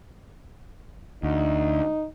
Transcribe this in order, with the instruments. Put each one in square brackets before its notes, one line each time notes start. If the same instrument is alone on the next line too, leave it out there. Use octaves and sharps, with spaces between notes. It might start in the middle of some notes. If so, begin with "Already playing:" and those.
[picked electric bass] D2 [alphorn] D#4